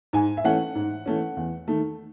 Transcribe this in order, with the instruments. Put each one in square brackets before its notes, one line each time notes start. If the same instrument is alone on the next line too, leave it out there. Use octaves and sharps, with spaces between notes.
[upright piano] G#2 G#5
E5
E3 A3 C#4 F#5
G#2
E3 A3 C#4
E2
D#3 A3